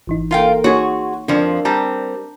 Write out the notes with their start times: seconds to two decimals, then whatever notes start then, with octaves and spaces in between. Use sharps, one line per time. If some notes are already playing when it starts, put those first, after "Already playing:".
0.07 G#1 E3 D#4
0.31 A#3 F4 A4 A#4 F5 G5
0.64 A#3 D#4 F#4 G#4 C#5 F#5 C6
1.28 F2 F3 D4 A#4
1.65 G3 C4 A5 A#5 G6